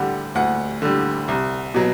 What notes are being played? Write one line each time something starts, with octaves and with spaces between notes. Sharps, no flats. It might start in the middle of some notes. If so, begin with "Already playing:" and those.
Already playing: D2 D3 G3 F#5
D2 F#5
D3 G3
C2
B2 F#3